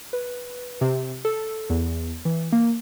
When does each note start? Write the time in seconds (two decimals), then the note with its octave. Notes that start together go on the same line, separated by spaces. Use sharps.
0.13 B4
0.81 C3
1.25 A4
1.70 E2
2.25 E3
2.52 A#3